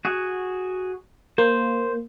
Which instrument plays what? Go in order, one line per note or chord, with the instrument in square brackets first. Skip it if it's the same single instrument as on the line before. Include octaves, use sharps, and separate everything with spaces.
[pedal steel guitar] F#4 G#4
[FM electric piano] A#3 [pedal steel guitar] C5